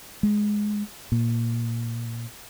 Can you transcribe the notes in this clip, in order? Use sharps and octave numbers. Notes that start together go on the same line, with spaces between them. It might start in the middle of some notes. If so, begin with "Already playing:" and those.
G#3
A#2